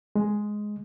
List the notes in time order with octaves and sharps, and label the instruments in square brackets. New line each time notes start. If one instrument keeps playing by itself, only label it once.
[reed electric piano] G#3